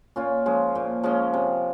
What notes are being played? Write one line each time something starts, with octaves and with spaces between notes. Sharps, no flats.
A#2 C#4 F4
F3 G#3 C#4
A#2
F3 G#3 C#4
C3